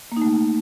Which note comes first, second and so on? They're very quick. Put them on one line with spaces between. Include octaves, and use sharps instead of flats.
A#3 D#4 A3